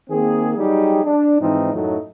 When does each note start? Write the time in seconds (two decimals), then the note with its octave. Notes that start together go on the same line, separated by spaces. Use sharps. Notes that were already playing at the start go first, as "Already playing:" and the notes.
0.10 D#3 A#3 C4 G#4
0.57 F#3 G3 D#4 G4 G#4
1.03 D4
1.40 G#2 E3 F3 C4 D#4
1.74 F#2 A2 F#3 A3 D#4